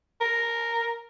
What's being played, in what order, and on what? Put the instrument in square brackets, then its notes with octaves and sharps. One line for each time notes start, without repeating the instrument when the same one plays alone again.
[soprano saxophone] A#4